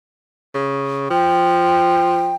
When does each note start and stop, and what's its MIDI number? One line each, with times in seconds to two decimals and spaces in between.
0.55 1.10 49
1.10 2.36 53
1.10 2.35 79